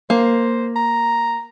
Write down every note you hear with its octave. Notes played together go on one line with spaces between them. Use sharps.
A#3 C5
A#5